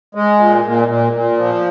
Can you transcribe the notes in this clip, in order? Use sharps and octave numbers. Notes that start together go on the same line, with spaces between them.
G#3
A#2
A#2
A#2
A#2
F3